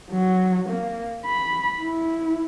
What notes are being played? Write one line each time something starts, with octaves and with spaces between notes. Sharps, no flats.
F#3
A#3
B5
E4